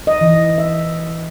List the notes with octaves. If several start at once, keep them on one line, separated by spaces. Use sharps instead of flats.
D#5
E3
E5